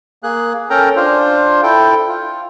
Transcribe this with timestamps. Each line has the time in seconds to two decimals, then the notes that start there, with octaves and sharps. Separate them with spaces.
0.23 A#3 G#4 F#6
0.70 C#4 A4 A#4 G5 A#5
0.96 D4 F4 C5
1.63 E4 A4 G5
2.08 F4